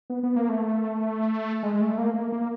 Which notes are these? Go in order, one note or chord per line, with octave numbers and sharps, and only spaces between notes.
B3
B3
A#3
A3
G#3
A3
A#3
A#3
A#3